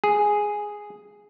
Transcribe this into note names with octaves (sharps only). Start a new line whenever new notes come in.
G#4